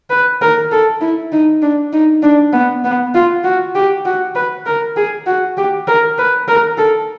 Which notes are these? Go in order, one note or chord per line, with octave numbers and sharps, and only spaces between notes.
B4
A#4
A4
E4
D#4
D4
D#4
D4
B3
B3
F4
F#4
G4
F#4
B4
A#4
G#4
F#4
G4
A#4
B4
A#4
A4